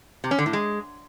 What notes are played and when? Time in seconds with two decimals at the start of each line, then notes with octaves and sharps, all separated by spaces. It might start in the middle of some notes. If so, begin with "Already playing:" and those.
0.24 C3
0.31 C#4
0.39 D3
0.46 A2
0.53 G#3